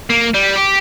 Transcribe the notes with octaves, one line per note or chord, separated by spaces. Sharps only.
A#3
G3
G4